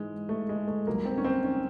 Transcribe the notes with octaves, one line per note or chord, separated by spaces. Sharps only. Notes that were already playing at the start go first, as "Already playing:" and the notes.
Already playing: G#2 E3 G#3
A3
G#3
A3
C2 B2 F#3 A#3
C4
C#4
C4
C#4